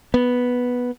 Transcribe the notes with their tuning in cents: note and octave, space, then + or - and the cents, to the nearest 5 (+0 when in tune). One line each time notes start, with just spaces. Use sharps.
B3 -5